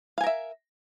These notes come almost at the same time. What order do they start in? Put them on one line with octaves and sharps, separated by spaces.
F5 G#5 A#4 E5